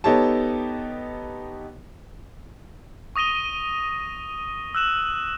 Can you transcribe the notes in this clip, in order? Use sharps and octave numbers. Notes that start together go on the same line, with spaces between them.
B3 D#4 G4 A4 C#5 A5
C#6 D#6 A#6 D#7 G7
E6 F#6 E7 F#7